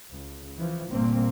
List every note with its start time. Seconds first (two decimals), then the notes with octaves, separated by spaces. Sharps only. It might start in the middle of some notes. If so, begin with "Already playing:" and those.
0.10 C#2
0.58 E3 F3
0.91 G1 G2 A#2 A#3 C4